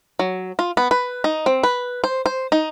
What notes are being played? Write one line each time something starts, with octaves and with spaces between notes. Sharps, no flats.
F#3
F4
B3
B4
D#4
C4
B4
C5
C5
D#4